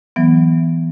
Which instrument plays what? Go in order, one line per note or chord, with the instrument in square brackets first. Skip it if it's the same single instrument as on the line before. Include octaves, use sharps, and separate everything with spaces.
[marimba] E3 F#3 B3